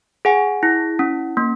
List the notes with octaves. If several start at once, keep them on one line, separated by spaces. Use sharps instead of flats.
G#4 F#5 G#5
E4
C#4
A#3